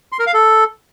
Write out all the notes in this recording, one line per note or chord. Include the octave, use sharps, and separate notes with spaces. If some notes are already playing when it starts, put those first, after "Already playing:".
C6
A#4
F5
A4